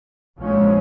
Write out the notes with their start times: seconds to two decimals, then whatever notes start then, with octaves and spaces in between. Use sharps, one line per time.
0.40 A#1 G#2 F3 G#3 C#4